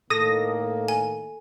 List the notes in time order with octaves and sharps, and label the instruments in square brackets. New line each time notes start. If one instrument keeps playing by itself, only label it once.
[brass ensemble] A2 D#3 A#3 [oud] A4 [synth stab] D#6 A#6
[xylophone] G#5